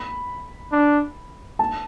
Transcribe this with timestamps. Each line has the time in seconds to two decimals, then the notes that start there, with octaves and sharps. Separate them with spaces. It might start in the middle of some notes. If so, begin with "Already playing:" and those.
Already playing: B5
0.72 D4
1.59 A5